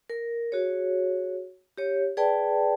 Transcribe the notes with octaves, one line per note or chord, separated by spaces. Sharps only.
A#4
F#4 G#4 C#5
G4 C#5
G#4 B4 D5 G5 A5